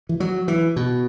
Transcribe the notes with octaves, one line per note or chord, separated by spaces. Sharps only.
E3
F#3
E3
B2